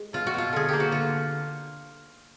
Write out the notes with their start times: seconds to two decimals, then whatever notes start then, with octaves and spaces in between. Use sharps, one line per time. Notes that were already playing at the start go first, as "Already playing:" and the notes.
Already playing: G#3
0.13 B2 F4
0.27 F#4
0.34 B2 F4
0.53 D3 G#4
0.69 A#3 G4
0.80 F#4
0.91 D3 F4